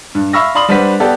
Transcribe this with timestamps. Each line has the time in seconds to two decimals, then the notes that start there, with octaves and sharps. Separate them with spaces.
0.15 G2
0.33 E5 F5 B5 C#6 E6 A#6
0.55 D5 F5 B5 C6 D#6 F#7
0.69 G3 D4 B4 C5 F#5 B6
1.00 B3 G4 A4 D5 F5